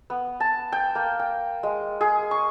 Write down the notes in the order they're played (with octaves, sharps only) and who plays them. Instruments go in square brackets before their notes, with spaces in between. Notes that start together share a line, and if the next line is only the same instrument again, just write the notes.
[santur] B3
A5
G5
A#3
G5
G#3
G#4
C#6